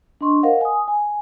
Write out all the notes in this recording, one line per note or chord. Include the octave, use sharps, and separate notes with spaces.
D4 D#5 C6 C#6
A#4 C5 D#5 F5 F#5
G#5 D#6
G#5